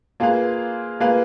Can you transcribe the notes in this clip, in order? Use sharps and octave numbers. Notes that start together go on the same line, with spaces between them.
A#3 F4 G#4 B4 F5
A#3 F4 G#4 B4 F5